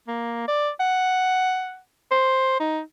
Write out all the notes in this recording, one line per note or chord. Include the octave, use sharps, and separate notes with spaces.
A#3
D5
F#5
C5
D#4